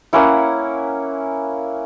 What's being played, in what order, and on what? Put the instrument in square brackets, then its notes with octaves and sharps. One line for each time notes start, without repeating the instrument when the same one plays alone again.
[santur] A#3 C#4 E4 F#5